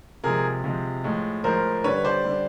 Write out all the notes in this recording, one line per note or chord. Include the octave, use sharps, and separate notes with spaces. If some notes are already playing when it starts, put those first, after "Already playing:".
C3 F3 G#3 G#4 A#4
C3 F3 G#3
A2 F3 G#3
A2 F3 G#3 A#4 C5
D3 G3 B4 C#5
C5 D5
D3 G3